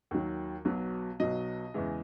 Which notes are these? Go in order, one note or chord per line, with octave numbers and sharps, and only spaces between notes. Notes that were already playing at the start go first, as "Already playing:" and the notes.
D#2 D#3 F#3
B1 B2 F#3
B1 B2 F#3 D#5
E2 C#3 E3 G#3